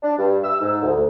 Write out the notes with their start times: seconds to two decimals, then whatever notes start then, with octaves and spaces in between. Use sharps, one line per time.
0.03 D4
0.19 G2
0.44 E6
0.61 G#2
0.83 D2